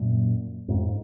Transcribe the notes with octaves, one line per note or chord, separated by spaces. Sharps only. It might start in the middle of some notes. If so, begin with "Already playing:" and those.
Already playing: F#2 A#2
F2 G#2